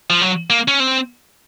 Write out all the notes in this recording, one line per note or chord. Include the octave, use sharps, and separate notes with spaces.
F3
F#3
A#3
C#4
C4